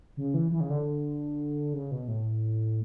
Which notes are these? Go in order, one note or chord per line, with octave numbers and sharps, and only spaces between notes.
C#3
E3
E3
C#3
D3
C#3
B2
A2